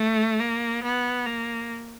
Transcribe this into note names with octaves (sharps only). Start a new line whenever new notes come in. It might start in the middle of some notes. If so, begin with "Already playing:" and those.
Already playing: A3
A#3
B3
A#3